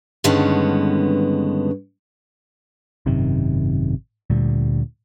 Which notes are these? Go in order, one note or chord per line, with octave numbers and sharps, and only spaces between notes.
G2 D3 D#3 G#3 B3 C#4
G#1 F#2 C3 D#3
D2 A#2 G3